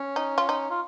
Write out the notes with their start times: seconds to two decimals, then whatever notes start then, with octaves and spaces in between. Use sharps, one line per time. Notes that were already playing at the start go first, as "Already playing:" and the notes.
Already playing: C#4
0.16 D#4
0.38 F4
0.49 D#4
0.70 F4